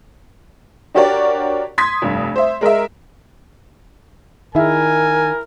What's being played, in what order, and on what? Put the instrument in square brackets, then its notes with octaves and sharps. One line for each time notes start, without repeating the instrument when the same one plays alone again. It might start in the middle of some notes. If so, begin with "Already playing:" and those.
[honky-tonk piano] D4 F#4 G4 A#4 C#5 D5
C6 D#6 G#6 B6
F1 G2
C5 E5
G#3 A#4 D#5 E5
[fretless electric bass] D#3 [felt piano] E4 G#4 E5 [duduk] A#4 [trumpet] G#5